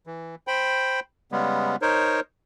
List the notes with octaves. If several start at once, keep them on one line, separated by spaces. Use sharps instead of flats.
E3
C5 G5 B5
C#3 G3 G#3 B3
D#4 A#4 C5 C#5